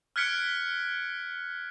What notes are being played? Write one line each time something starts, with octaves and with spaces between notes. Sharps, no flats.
F6 F#6 G#6 B6 C#7 D7